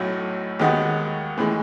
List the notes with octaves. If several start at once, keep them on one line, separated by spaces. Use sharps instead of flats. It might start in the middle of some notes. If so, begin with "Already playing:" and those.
Already playing: B1 A2 F#3 A3
D#2 D#3 G#3 B3 F#4
A2 E3 G#3